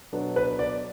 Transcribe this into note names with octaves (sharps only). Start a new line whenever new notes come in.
B2 F#3 B3 D4
B4
D5